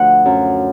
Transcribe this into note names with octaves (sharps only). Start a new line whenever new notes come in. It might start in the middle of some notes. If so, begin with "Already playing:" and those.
Already playing: D2 F3 F#5
F#2